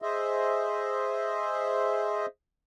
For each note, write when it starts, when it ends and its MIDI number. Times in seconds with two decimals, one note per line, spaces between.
0.02 2.26 68
0.02 2.26 72
0.02 2.26 75
0.02 2.26 76